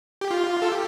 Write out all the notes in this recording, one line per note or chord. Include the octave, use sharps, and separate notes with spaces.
G4
F4
A4
G4